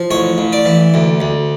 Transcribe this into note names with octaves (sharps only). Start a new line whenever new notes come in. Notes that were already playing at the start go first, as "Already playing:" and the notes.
Already playing: F3
A1 C#5
A1
D5
E3
D2
D2